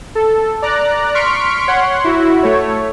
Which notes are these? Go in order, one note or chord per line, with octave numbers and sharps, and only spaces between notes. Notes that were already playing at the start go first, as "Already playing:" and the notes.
A4
D5 A#5 F#6
C6 C#6 F6 B6 D7
C#5 F#5 C6
E4 F#4
A3 C#5